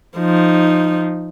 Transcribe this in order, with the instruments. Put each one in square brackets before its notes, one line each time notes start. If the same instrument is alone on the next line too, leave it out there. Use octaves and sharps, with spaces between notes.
[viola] F3 D#4